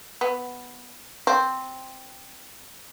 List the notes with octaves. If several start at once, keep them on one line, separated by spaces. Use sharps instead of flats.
B3
C4